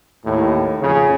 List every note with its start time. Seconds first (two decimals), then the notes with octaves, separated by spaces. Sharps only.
0.24 D#2 A2
0.80 F2 C#3